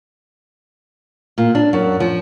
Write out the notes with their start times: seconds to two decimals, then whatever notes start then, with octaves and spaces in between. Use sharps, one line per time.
1.38 A#2
1.55 D4
1.73 F#2
2.00 F3